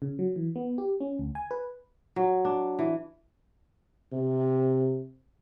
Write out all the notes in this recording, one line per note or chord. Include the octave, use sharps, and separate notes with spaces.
C#3
F#3
E3
B3
G4
C#4
D2
G#5
B4
F#3
D4
E3
C3